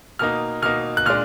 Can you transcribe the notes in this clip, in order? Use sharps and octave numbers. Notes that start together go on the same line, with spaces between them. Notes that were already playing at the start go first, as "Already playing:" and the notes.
B2 A#3 D#4 F6
B2 A#3 D#4 F6
F#6
A#2 G#3 D4 F6